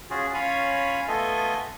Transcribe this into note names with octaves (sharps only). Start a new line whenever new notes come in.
C#4 F4 F#4 G#4
C#4 F4 C#5 F5 G#5 B5
A3 B3 F4 A4 D#5 G#5